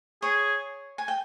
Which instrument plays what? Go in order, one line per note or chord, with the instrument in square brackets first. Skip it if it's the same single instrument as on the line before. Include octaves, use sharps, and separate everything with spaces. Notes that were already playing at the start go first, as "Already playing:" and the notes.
[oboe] G#4 [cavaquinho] C#5
[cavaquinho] G#5
G5